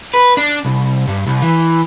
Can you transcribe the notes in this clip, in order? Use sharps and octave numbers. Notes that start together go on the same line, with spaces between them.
B4
D4
C2
G2
C2
E3